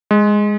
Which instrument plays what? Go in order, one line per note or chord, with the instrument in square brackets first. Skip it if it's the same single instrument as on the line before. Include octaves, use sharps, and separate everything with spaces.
[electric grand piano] G#3